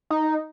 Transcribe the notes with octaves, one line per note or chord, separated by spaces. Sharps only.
D#4